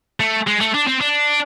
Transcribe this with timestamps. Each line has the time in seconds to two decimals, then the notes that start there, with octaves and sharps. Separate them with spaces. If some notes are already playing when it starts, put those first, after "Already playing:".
0.20 A3
0.47 G#3
0.60 A3
0.74 D4
0.87 C4
1.01 D4